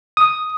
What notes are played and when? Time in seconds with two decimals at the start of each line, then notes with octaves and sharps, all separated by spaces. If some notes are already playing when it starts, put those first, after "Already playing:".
0.17 D#6